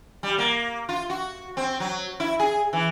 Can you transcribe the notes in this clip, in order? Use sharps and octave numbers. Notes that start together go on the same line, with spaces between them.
G3
A#3
F4
F#4
C4
F#3
E4
G#4
E3